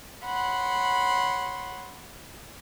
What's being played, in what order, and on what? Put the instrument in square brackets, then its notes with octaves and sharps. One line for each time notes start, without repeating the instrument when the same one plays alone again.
[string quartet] C#5 F#5 B5 C6